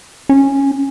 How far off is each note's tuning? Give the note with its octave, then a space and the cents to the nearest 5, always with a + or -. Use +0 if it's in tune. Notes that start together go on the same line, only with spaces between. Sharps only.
C#4 -10